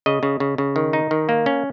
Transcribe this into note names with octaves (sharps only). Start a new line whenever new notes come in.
C#3 D#5
C#3
C#3
C#3
D#3
D#4
D#3
A#3
C#4